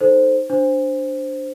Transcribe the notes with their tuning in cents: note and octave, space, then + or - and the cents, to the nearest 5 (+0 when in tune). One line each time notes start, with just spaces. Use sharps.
D#4 -5 A4 +0 C5 +0
D4 +0 C5 +0